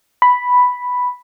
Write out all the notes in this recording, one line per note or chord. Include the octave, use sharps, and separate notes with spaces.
B5